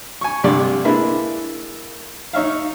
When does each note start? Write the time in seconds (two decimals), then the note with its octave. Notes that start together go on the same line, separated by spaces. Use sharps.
0.21 G#5 C#6
0.44 C2 G2 D3 A3 D5
0.85 G#3 A#3 D4 E4 B4
2.33 D#4 C#5 E5 F5